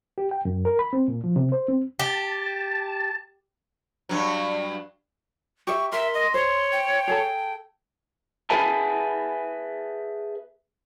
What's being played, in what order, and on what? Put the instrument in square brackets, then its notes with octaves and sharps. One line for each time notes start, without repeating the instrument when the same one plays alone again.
[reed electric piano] G4
G5
F#2
A#4
B5
C4
A#2
F3
C3
C5
C4
[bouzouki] G4 [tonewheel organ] A5
[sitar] G2 F#3
[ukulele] G4 E5 [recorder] C#6
[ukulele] A#4 [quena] E5 [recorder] C6
[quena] D#5
[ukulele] C5 [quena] C#5
[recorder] G5
[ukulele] G#4 A4 A5
[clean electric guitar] G#4 B4 E5 G#5 A5